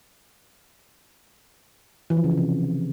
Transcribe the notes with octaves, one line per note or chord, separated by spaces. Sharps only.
E3
F3
C#3
E3
C3